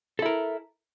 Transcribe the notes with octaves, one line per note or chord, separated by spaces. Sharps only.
E4 A4 A#4